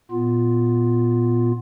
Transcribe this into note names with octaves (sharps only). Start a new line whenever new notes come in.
A#2 B3 F4